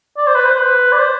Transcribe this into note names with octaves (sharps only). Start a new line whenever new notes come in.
D5
C5
B4
C5
B4
D5
C5